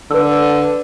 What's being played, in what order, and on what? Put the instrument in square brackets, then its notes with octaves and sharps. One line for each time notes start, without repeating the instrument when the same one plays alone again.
[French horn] D3 [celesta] B4 E6